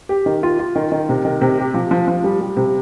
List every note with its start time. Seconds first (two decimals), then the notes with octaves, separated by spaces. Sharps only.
0.09 G4
0.26 D#3
0.43 F4
0.59 F4
0.76 D#3
0.92 D#3
1.09 C3
1.25 D#3
1.41 C3
1.59 G4
1.74 F3
1.91 F3
2.08 F3
2.24 G3
2.41 G3
2.57 C3